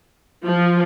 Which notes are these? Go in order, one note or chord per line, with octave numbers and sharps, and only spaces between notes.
F3